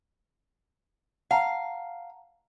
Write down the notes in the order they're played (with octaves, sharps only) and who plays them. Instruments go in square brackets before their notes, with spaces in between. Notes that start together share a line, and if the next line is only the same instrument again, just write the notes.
[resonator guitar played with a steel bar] F5 [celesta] F#5 A5 A#5